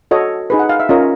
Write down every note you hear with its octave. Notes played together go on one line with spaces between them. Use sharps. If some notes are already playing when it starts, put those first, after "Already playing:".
F#4 A4 C#5 D#5
D#4 G#4 B4
F#5
F5
E5
C#4 F4 A#4 C#5 D#5